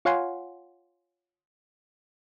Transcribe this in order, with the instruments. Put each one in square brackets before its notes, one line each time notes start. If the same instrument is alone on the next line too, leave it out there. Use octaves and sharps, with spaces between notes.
[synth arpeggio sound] F4 C#5 F5 F#5 G#5 C6